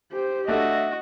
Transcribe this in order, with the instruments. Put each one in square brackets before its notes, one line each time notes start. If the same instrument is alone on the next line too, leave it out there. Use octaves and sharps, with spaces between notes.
[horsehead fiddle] G4 C5
[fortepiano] A3 D4 A4 [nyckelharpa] F#4 [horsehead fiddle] D#5 [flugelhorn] E5